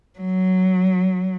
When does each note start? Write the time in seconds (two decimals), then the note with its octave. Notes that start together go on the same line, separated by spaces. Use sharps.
0.19 F#3